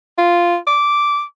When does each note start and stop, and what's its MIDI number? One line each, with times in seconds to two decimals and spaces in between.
0.18 0.57 65
0.67 1.23 86